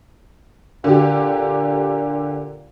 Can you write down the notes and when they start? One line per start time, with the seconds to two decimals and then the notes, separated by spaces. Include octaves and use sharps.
0.84 A#2 D3 G4